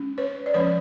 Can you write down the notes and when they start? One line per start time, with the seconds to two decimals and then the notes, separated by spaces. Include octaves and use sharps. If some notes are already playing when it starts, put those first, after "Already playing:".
Already playing: G#3 C#4
0.18 B4 C#5
0.46 D5
0.54 F3 G#3 C#4 B4 C#5